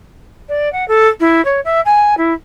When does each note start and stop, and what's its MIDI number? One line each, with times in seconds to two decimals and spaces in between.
0.49 0.72 74
0.73 0.87 78
0.88 1.08 69
1.20 1.44 64
1.45 1.60 73
1.65 1.81 76
1.85 2.17 80
2.17 2.33 64